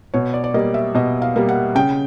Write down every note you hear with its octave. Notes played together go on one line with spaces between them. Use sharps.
B2 C#5
D5
D5
G3 A#3 D#5
E5
B2 D#5
F5
G3 A#3
F#5
C#3 G5